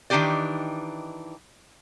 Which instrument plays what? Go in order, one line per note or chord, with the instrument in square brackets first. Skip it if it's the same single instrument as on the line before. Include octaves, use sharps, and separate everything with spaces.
[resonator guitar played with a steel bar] D#3 E3 D4 D#4 G4 D5